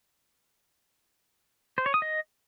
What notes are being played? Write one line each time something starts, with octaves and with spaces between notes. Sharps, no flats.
C5
C#5
D#6
D#5